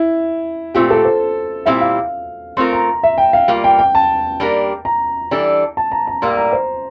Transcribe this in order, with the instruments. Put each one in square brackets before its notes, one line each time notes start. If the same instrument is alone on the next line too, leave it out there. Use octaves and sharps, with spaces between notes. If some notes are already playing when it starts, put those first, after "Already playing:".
Already playing: [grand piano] E4
[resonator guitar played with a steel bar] A#2 A3 C4 G4 [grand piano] F4
[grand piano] A4
C5
[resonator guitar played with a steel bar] A#2 G3 C4 E4 G4 [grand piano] E5
[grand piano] F5
[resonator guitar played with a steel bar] A3 C4 F4 A#4 [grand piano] C6
[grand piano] A#5
E5
G5
F5
[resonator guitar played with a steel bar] G3 A#3 F4
[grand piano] G5
G5
A5
[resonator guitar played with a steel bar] G3 A#3 D4 G4 A#4
[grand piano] A#5
[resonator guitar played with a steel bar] E3 G3 D4 A4
[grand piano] A5
A#5
A#5
[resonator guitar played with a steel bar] A2 G3 A#3 [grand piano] C6
[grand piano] A#5
C5